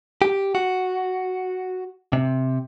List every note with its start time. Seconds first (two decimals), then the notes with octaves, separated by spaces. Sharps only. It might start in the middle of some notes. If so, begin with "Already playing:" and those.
0.22 G4
0.55 F#4
2.13 C3